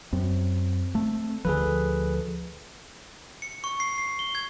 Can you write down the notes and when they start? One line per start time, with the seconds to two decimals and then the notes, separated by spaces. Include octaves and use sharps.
0.13 F#2 C4
0.95 A3
1.45 D2 F3 G#4 A4 B4
3.42 C#7
3.64 C#6
3.80 C7
3.98 C7
4.19 G7
4.35 G#6